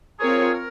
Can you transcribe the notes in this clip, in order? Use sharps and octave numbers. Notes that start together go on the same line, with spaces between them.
C4 F4 G#4 A#4 C#5
A#4